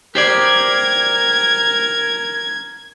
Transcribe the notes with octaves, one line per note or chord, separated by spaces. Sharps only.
G4 A#4 C5 D5 G#6